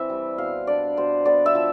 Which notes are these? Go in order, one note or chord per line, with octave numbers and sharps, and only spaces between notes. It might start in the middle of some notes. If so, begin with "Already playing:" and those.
Already playing: E3 C4 E5
G3
B2 F5
D4 D5
B2 C5
B3 D5
E5
F3